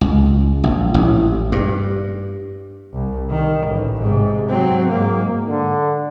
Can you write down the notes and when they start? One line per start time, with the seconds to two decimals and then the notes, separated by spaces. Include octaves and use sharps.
0.01 C#2
0.64 A#1
0.94 A1
1.52 G2
2.93 C2
3.30 D#3
3.67 A1
4.01 G#2 C3
4.50 F#3 C4
4.90 G#2 A#3
5.49 D3